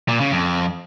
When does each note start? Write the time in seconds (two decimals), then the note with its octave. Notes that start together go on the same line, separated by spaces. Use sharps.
0.08 A#2
0.20 C#3
0.32 F2